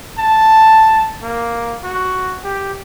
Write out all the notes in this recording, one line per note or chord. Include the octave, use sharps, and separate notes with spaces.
A5
A#3
F#4
G4